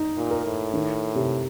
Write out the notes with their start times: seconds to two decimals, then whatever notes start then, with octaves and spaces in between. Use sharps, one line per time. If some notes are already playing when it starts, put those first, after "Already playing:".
Already playing: D#4
0.17 A#2
0.31 A#4
0.44 A2
0.74 D#3
1.15 C3